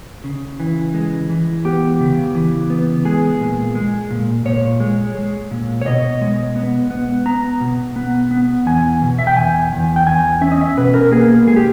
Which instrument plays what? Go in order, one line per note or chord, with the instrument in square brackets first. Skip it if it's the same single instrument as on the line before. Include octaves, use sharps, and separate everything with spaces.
[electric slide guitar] C#3
E3
G#3
E3
B3 G4
C#3
E3
B3
G#3 G#4
A#2
G#3
A#2
A#2 C#5
G#3
G#3
A#2
C#5
B2 D#5
G#3
B3
B3
B3 A#5
B2
B3
B3
E2 G#5
B2
E5
G5
E2 G#5
E2
G5
E2 G#5
C#4 E5
D#5
E5
B2 B4
A#4
A#3 G#4
G#3 G#4
G4